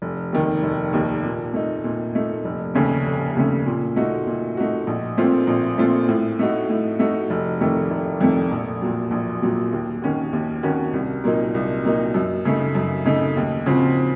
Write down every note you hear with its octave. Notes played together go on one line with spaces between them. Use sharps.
F1
D#2 D#3
F1
D#2 D#3
A#2
A3 D#4
A#2
A3 D#4
F1
D#2 C#3 A3 C#4
F1
D#2 C#3 A3 C#4
A#2
A3 D#4 F#4
A#2
A3 D#4 F#4
A#1
A#2 A3 C4 F4
A#1
A#2 A3 C4 F4
A2
A3 D#4 F#4
A2
A3 D#4 F#4
F1
F2 D#3 A3
F1
F2 D#3 A3
A#1
A#2 F#3
A#1
A#2 F#3
D#2
D#3 A#3 C#4 F#4
D#2
D#3 A#3 C#4 F#4
C2
A#2 F#3 A#3 D#4
C2
A#2 F#3 A#3 D#4
F#2
C#3 A3 D#4
F#2
C#3 A3 D#4
D#2
C#3 F3 C4 F#4